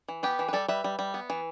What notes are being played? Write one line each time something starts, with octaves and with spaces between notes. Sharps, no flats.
E3
B3 G4 B4
E3
B4
G3 A4 D5
G3 B4 E5
G3
G3
B3
E3